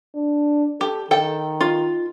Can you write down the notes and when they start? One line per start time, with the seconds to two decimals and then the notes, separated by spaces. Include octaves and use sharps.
0.15 D4
0.81 G4 A4
1.11 D#3 A4 G5
1.61 F4